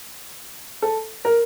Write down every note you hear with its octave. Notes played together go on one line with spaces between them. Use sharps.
A4
A#4